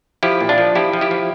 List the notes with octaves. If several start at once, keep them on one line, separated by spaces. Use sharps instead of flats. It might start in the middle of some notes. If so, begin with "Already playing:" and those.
F3 E4 G4
A#2
D4 F4
F3
F3 E4 G4
F3
E4 G4
F3